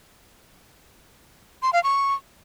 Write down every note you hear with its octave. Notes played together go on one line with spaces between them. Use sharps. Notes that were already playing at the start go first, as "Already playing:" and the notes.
C6
F5
C#6